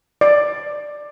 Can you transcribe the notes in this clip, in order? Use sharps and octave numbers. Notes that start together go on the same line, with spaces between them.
D5